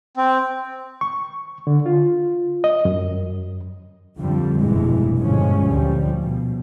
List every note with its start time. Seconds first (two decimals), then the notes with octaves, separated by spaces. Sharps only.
0.17 C4
1.01 C#6
1.67 D3
1.86 F4
2.64 D#5
2.85 F#2
4.17 F2 D3 G3
4.59 F1 G2 B2 E3 G#3
5.16 G2 A#2 D3 F3 G#3 C#4
5.67 D2 F3 G3
6.20 B2